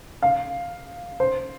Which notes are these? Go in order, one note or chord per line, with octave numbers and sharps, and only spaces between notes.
F5
C5